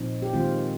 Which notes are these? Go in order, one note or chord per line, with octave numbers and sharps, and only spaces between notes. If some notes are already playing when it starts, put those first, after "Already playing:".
Already playing: A#2 F3 C4 D#4
G4
D#3 G#3 C4 F4